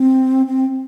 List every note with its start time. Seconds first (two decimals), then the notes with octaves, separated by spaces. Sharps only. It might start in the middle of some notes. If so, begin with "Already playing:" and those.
Already playing: C4
0.46 C4